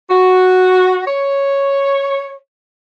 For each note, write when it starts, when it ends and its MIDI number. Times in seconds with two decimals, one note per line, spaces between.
0.10 1.01 66
1.07 2.34 73